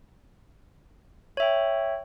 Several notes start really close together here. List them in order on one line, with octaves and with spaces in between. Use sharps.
C#5 E5 G5